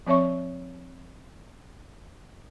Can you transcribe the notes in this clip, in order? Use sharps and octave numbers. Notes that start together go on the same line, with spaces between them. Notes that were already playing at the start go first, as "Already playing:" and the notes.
F3 C4 C#5 E5 C#6